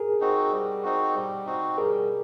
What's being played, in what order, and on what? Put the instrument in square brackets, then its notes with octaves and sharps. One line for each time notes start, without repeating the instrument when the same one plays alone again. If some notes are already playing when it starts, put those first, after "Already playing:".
Already playing: [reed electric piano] G#4 A#4
[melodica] C4 D#4 F#4
G3
C4 D#4 F#4
G3
C4 D#4 F#4
[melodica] G3 [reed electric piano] G#4 A#4